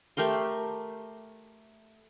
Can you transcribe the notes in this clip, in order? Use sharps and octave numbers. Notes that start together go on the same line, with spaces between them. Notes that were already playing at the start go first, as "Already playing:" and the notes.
A3 G4 A#4 C6